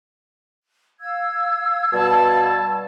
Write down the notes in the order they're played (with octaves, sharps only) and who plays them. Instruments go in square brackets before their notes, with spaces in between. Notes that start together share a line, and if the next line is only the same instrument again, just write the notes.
[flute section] F5 E6 G#6
[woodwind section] B2 G3 A5